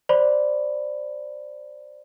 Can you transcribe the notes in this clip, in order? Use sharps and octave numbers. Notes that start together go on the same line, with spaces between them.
C5 D5 B5